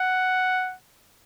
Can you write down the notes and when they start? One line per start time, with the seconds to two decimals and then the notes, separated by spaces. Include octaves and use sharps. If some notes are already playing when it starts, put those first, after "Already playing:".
Already playing: F#5